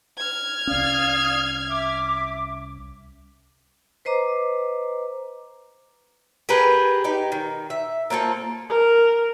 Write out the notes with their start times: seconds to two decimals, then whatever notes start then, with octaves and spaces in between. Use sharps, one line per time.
0.18 F6 G#6
0.67 C2 C#4 D5 F5 D#6
1.67 E5 D6
4.05 B4 C5 D#5 A#5 D6
6.49 G4 G#4 A#4 B4
7.04 D#4 G4
7.32 D#3
7.70 E5
8.10 A#3 C4 F4 A4
8.70 A#4